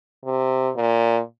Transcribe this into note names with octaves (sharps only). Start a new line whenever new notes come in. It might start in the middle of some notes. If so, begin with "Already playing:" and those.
C3
A#2